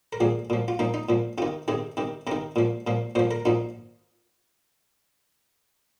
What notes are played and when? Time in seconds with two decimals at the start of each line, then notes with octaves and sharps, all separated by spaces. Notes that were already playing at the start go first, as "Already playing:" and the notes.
0.13 A#4
0.20 A#2 F3 G#4
0.50 A#2 F3
0.68 F4
0.79 A#2 F3 D#4
0.94 D#4
1.09 A#2 F3
1.38 C3 F4
1.42 D#3
1.68 C3 D#3 G#4
1.97 C3 D#3
2.27 C3 A#4
2.32 D#3
2.56 A#2 F3
2.87 A#2 F3
3.15 A#2 C5
3.19 F3
3.31 A#4
3.45 A#2 F3 D#4